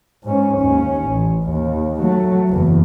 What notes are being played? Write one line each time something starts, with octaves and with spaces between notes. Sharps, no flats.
G#2 C#4
D#2 C#4
A1
D#2
F#3 A3
F#1 E2